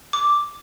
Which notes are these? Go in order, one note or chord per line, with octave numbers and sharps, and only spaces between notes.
D6